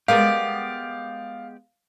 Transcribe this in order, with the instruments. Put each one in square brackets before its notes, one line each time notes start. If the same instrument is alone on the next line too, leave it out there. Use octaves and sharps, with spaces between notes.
[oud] G#3 B3 A#4 [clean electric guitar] G4 D5 [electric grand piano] F5